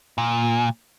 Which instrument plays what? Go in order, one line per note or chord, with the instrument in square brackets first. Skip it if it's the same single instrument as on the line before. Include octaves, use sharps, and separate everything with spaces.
[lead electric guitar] A#2